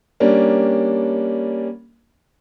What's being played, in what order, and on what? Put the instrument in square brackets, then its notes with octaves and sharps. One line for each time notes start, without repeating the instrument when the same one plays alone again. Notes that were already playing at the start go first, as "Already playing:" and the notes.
[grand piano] G3 A#3 C#4 D4